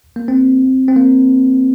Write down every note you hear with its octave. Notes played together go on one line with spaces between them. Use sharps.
A#3
C4
C4
A#3